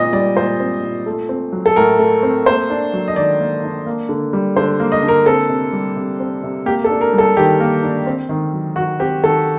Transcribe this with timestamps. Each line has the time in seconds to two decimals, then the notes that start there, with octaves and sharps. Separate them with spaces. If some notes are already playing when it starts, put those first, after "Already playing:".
Already playing: A#2 C4 D#5
0.13 G3 D5
0.36 A#2 C5
0.60 C4
0.83 A#2
1.06 A3
1.29 C4
1.53 F#3
1.66 A4
1.76 A2 A#4
1.99 A3
2.23 C4
2.46 A#3 C5
2.70 D4
2.93 F#3
3.08 D#5
3.16 D#3 D5
3.40 A#3
3.64 D4
3.86 A#3
4.09 D3
4.33 G3
4.56 D3 C5
4.80 A#3
4.92 D#5
5.03 D3
5.08 A#4
5.26 C4 A4
5.49 C3
5.72 G3
5.96 C3
6.20 C4
6.43 C3
6.66 A#3 G4
6.84 A4
6.90 D4
7.01 A#4
7.13 G3
7.18 A4
7.37 D#3 G4
7.60 A#3
7.83 D4
8.07 C4
8.29 D#3
8.53 F#3
8.76 D#3 F#4
9.00 C4 G4
9.23 D#3 A4